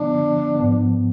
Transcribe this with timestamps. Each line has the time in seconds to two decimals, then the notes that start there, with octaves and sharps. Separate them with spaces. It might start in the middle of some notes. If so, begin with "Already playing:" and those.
Already playing: D3 F3 B3 D4
0.55 G#2 F3 B3